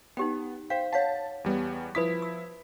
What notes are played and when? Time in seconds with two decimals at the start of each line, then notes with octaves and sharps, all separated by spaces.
0.17 B3 D#4 G4 G5
0.70 C5 F5 G5
0.93 C#5 F5 F#5 A5
1.44 E2 G3 B3
1.95 F3 E4 B4 D#6 B6
2.22 E6